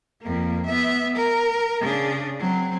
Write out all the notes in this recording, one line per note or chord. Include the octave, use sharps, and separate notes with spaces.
F2 A#3
B3 E5
A#4
C#3 D4
F#3 C4